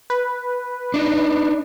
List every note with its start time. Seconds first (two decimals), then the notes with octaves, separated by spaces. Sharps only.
0.10 B4
0.94 D4 D#4